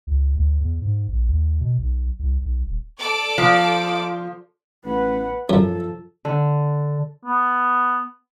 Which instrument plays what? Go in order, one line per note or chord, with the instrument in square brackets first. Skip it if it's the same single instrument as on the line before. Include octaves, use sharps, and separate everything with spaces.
[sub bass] C#2
D2
E2
G#2
A#1
D#2
B2
B1
C2
B1
D#1
[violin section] A4 D5 D6
[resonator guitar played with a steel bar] F3
[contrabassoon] A1 [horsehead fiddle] B4 F#5
[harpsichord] F#2 [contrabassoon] F3 [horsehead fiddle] A4
[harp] D3
[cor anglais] B3